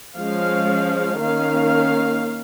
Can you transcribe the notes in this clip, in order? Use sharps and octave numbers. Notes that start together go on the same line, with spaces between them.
F3 G#3 C#4 F5
D#3 A#3 C#4 F5